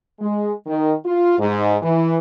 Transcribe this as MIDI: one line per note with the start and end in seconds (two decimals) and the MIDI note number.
0.20 0.53 56
0.66 0.94 51
1.05 1.37 65
1.38 1.76 44
1.82 2.17 52